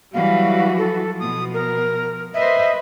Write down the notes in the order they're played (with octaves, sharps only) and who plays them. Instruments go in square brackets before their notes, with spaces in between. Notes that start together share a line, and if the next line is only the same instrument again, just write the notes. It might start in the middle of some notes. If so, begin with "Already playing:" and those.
[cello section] E3 F#3 F#4 [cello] G3 [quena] F5
[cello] F3 [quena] A4
[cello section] B2 [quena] D#6
[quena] A#4
[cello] B4 [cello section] C5 D#5 [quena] E5